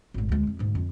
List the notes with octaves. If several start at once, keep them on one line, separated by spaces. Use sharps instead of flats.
G#1 A2
D2 G#3
F2
D2 G#2
F2